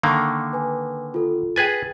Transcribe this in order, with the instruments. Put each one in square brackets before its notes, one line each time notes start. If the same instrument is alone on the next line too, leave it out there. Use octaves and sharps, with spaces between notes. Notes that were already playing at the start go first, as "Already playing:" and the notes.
[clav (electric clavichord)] D3 D#3 A#3 [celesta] F5 C#6
[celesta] B4 G#5
F4 A4
[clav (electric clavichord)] G#4 B4 G#5 [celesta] G5 G#6 A6